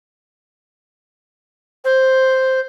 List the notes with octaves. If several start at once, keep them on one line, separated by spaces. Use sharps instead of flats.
C5